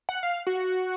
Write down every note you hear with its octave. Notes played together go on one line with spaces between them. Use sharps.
F#5
F5
F#4